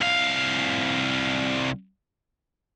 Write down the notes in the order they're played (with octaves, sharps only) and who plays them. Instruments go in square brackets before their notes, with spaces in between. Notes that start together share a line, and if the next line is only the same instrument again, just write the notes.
[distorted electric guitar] C2 F5